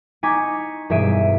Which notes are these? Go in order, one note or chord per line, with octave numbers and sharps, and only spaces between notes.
D#4 G#5 C#6 D6 B6
E1 G2 G#4 E5 D7 D#7